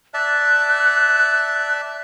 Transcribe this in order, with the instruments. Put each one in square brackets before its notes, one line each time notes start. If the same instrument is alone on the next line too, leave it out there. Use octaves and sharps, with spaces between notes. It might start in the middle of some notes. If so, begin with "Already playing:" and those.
[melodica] D5 E5 A5 [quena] F#6